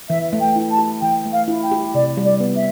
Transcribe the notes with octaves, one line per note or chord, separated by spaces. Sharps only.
E3 E5
A3
G5
E4
A5
G4
E3 G5
A3
F5
E4
G5
G4
C3 D5
G3
D5
B3
E5